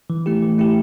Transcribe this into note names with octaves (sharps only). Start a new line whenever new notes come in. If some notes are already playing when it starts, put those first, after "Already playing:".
E3
A3 E4 G4
E3
A3 E4 G4